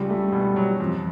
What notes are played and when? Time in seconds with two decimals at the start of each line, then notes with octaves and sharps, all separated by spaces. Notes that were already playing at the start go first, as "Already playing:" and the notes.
Already playing: C#2 G3
0.09 A3
0.32 B2
0.56 F#3
0.80 F2